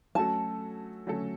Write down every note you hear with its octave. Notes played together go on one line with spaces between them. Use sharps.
F#3 A3 C#4 F#4 A4 A5
F#3 A3 C#4 F#4 A4